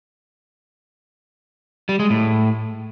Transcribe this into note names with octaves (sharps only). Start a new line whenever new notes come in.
G3
G#3
A2